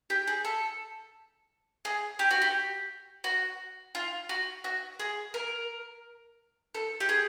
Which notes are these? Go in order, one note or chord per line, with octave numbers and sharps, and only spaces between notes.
G4
G#4
A4
G#4
G4
F#4
G4
F#4
F4
F#4
F#4
G#4
A#4
A4
G4
G#4